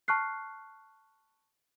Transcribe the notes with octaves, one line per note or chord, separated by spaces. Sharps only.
A5 C#6 F6 F#6 C7